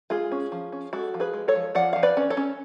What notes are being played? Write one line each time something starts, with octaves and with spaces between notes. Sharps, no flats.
G#3 F4 G#4
C#4
F3
C#4
G#3 F#4 A4
F3
G#4 B4
G#3
A4 C#5
F3
F3 D5 F#5
F3 F5
B4 D5
C#4
A4 C#5
C#4